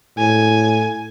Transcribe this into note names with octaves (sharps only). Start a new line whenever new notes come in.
A2 G#5